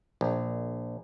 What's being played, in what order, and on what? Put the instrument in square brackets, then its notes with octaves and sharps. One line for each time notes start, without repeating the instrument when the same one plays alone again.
[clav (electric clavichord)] A#1